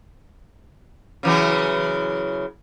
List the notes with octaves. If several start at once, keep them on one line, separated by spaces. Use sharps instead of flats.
C#3 E3 F#3